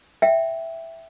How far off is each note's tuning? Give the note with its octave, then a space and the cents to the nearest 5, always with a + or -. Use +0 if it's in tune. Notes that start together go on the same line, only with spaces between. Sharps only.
E5 +0 G5 +0